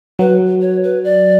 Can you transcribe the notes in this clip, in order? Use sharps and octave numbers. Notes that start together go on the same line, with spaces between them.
F#3 B4
C#5
B4
D5